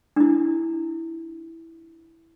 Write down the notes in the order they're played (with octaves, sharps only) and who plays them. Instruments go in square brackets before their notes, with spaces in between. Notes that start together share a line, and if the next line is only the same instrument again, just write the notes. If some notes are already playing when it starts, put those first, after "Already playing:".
[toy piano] D4 E4